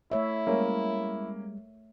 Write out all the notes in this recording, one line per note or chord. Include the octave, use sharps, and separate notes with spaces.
A3 E4 C#5 E5
G3 G#3 A#3 C#4 A#4